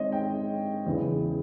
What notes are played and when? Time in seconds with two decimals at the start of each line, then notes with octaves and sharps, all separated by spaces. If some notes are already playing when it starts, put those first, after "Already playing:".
Already playing: D#3 G#3 C4 C#5 D#5
0.12 G5
0.86 E2 C#3 E3